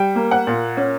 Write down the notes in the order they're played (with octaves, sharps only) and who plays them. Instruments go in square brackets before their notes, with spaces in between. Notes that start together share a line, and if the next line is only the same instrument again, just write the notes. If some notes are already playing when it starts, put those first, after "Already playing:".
Already playing: [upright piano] G3 G5
A#3
F#5
A#2
C#4